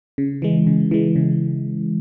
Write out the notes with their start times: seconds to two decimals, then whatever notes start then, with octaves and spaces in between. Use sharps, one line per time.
0.18 C#3
0.42 E3 G#3
0.67 C#3
0.91 E3 G#3
1.16 C#3